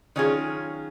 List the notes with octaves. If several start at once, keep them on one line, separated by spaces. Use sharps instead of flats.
D#3 F#3 C#4 F4 G#4